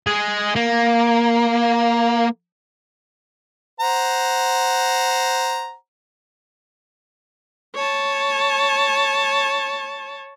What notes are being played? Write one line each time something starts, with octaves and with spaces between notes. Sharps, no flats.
G#3 G#4
A#3
C5 F#5 A#5
C#5 A5